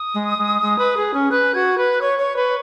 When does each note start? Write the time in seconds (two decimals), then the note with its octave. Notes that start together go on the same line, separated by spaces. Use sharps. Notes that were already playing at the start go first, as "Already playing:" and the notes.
Already playing: D#6
0.14 G#3
0.38 G#3
0.62 G#3
0.79 B4
0.97 G#4
1.14 C#4
1.31 B4 F#6
1.54 F#4 G#6
1.77 B4 F#6
2.01 C#5 C#6
2.19 C#5
2.36 B4 C#6